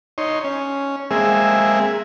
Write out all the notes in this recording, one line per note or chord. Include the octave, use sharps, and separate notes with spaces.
D#4 C#5 C6
C#4
G#3 A#3 C4 G#4 E5